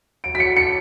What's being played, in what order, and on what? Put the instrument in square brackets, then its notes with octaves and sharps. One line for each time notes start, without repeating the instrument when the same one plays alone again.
[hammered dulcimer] F#3 [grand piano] D7
[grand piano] B6
C#7
[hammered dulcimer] D4
[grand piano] C#7